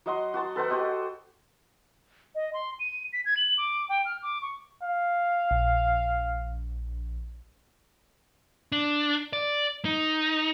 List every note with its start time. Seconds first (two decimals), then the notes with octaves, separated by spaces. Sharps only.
0.06 F#3 D#5 F#5 C6
0.34 F#4 F#5 A5 C6
0.56 A4 B4 C5 F#5
0.70 F#4 G4 C5 D#5
2.35 D#5
2.53 C6
2.80 D#7
3.13 B6
3.25 G#6
3.37 F#7
3.58 D6
3.89 G5
4.05 F6
4.22 D6
4.42 C#6
4.83 F5
5.51 A#1
8.72 D4
9.33 D5
9.85 D#4